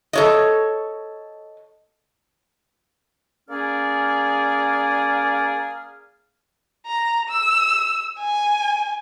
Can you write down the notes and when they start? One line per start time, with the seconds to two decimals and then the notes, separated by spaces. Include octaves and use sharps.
0.13 A4 C#5 D#5
3.50 A#3 C#4 G#4 D5 F6
6.86 A#5
7.29 E6
8.19 G#5